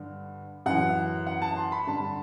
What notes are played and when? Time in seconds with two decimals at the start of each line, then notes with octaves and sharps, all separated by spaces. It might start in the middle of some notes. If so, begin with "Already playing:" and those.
Already playing: G2 D3
0.66 F#2 E3 F#5
1.27 F#5
1.42 A5
1.56 C6
1.72 B5
1.87 G2 D3 A5